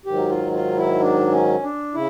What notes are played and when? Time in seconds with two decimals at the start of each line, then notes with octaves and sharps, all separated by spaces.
0.06 G#2 D#3 F#3 G4
0.29 F4
0.53 F4
0.76 E4
1.00 D4
1.31 C#4
1.63 D4
1.94 C#3 E4